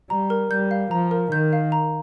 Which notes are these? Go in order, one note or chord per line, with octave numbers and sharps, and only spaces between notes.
G3 A#5
A#4
G3 G6
F5
F3 A#5
A#4
D#3 G6
F5
A#5